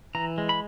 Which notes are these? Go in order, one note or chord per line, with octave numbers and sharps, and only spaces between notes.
E3 A#5
G#3
B5